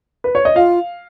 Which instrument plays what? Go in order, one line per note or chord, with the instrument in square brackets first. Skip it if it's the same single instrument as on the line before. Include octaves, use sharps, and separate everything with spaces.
[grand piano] B4
C#5
D#5
[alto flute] F4 [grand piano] F5